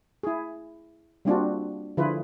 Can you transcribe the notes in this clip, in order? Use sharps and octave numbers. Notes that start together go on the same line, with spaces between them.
E4 G#4
G3 A#3 C4 D4 F4 F#4
D3 F3 E4 F4 G#4 B4